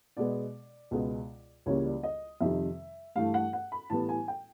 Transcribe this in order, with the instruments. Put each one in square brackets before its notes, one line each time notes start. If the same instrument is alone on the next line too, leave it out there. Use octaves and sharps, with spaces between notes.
[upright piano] B2 G#3 B3 D5
C#2 B2 G#3 B3
C#2 C#3 E3 G3 A#3 C#5
D5
D#5
F2 C3 D#3 G3 E5
G2 E3 A3 F5
F#5
F#5
B5
A2 E3 G3 B3 A5
G#5
G5